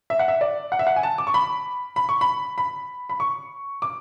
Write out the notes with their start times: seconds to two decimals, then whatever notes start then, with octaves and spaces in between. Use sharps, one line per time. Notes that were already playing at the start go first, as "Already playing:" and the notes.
0.10 E5
0.19 F#5
0.28 E5
0.41 D5
0.72 F#5
0.79 E5
0.87 F#5
0.96 G#5
1.03 A5
1.18 D6
1.27 C#6
1.34 B5
1.96 B5
2.09 C#6
2.21 B5
2.58 B5
3.09 B5
3.20 C#6
3.82 D6